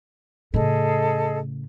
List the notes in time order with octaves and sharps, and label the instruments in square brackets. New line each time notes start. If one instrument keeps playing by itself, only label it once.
[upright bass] A2 C#3 [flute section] G#4 A4 D#5